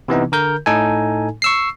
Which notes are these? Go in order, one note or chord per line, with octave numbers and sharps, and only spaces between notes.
C3 E3 B3 D#4
D3 A#4 G6
A2 D#4 A4 G#5
C#6 E6 C7